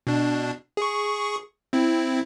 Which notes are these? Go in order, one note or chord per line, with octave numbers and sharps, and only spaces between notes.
B2 D4
G#4 C#6
C4 E4